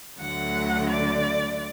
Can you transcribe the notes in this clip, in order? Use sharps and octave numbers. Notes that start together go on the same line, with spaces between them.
D2 D3 F#3 A3 F#5
D5